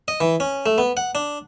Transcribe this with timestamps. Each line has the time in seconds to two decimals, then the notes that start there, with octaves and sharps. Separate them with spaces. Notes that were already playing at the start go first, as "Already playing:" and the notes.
0.08 D#5
0.21 E3
0.40 C#4
0.66 A3
0.78 B3
0.97 F#5
1.15 D4